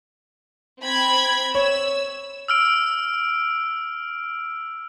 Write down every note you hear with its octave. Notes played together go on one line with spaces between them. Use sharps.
C4 B5 G#6
C#5 E6
E6 F6 D7